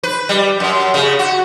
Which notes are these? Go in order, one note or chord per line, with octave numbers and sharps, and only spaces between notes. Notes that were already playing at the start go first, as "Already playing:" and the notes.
B4
G3
F#2
C#3
F#4